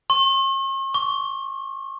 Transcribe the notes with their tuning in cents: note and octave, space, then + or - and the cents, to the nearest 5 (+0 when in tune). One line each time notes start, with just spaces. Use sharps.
C#6 -45
C#6 +35